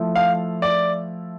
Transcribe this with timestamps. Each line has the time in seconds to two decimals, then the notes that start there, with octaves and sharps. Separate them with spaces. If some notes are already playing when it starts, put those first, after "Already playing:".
Already playing: F3 A3 E4
0.15 F5
0.62 D5